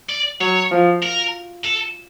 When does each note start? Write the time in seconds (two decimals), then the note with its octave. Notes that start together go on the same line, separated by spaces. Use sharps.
0.10 D5
0.41 F#3 C#5
0.72 F3
1.02 A#4
1.64 A4